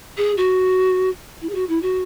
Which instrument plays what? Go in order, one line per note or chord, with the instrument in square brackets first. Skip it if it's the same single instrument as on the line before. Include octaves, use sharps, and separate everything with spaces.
[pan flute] G#4
F#4
E4
G#4
F#4
E4
F#4